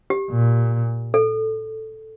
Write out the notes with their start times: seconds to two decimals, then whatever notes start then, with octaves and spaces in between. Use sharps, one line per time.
0.10 G4
0.30 A#2
1.14 A4